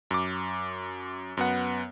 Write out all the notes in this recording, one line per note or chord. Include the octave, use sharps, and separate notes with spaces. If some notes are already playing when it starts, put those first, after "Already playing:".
F#2 D6
F#2 B3 F#5